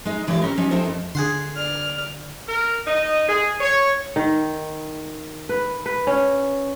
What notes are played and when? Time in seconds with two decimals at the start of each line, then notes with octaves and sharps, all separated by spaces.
0.05 G#3 D#4
0.27 D3 E3 G#3 G4 C#5 D5
0.42 C4 C#4 A#4
0.57 F3 G3 C#4 D#4
0.71 C4 D#4 E4 A4 A#4 C5
0.85 F2
1.15 D3 G#4 F#5 C6
1.56 D5 F6
2.49 A#4
2.87 D#4 D#5
3.29 G#4
3.60 C#5
4.16 D#3
5.49 B4
5.86 B4
6.07 C#4